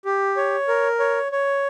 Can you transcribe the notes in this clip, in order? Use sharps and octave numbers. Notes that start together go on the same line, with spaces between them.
G4
C#5
A#4
C#5
C#5